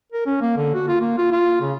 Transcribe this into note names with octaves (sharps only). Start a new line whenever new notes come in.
A#4
C#4
A#3
D3
F#4
F4
A#3
F4
F4
C#3